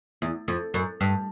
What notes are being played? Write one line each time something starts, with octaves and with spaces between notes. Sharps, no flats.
E2
F2
F#2
G2